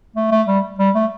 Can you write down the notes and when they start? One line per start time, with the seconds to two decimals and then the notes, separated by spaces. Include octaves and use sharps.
0.16 A3
0.32 A3
0.48 G3
0.79 G3
0.95 A3